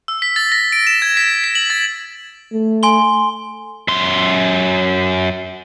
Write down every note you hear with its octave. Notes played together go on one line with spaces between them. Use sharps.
E6
B6
A6
A#6
D7
E7
G#6
B6
B6
F#7
A6
A3
G#5 C6 G7
F#2 C6